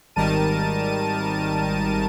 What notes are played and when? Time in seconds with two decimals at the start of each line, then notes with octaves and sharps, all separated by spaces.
0.16 G#1 D#3 G3 A#4 A5 D#7